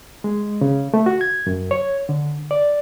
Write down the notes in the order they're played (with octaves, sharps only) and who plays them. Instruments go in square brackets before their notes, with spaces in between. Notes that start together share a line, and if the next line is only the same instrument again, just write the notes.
[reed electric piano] G#3
C#3
A3
F#4
G#6
F#2
C#5
D3
D5